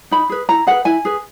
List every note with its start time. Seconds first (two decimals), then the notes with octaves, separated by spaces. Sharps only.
0.11 D#4 B5
0.30 G#4 B4
0.49 E4 A#5
0.67 G#4 B4 F#5
0.85 E4 G#5
1.05 G#4 B4